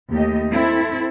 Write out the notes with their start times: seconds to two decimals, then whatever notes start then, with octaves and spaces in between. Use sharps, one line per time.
0.10 D#2 A3 G4 D#5
0.51 C4 E4 A4